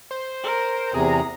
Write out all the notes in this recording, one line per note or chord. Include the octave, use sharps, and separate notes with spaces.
C5
A#4
E2 C3 G#4 A#5